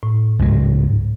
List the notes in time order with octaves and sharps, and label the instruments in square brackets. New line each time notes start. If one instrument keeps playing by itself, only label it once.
[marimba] A2
[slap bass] C#2 G#2 F#3